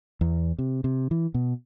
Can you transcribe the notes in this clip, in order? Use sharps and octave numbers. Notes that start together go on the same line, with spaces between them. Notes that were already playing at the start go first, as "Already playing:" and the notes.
E2
C3
C3
E3
B2